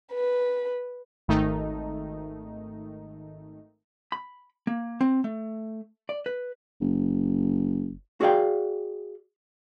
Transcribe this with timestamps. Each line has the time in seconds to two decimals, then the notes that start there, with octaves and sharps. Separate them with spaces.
0.12 B4
1.28 G#1 D#3 A3 D#4
4.12 B5
4.67 A#3
5.01 C4
5.24 A3
6.09 D5
6.26 B4
6.81 F#1
8.21 F#4 G#4 D5 F5 G5